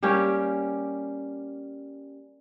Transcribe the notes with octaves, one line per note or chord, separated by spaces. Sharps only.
G3 A#3 C#4 G4